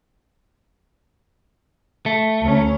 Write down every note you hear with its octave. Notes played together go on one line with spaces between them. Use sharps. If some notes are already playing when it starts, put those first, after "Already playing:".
A3
D2 C#4